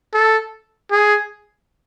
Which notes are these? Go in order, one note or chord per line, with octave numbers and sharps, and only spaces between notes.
A4
G#4